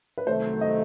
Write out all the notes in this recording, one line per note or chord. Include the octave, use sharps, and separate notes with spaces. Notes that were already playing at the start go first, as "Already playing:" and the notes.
B4
C2 C3 D#3 F#3 A3 C5
D#5